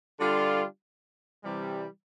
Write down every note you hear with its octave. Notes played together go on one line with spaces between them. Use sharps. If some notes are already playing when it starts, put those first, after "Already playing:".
D3 G3 D4 F4
C3 E3 G3